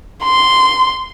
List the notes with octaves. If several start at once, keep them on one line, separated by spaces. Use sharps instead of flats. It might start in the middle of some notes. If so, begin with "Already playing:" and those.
C6